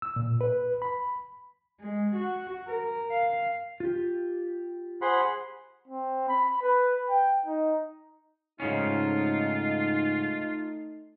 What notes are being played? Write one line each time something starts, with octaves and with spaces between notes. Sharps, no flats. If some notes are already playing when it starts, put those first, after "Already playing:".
E6
A#2
B4
B5
G#3
F#4
A#4
F5
F4 G4
G#4 C5 F#5 B5
C4
B5
B4
G5
D#4
G#2 C#3 A3 C#4 D#4 F4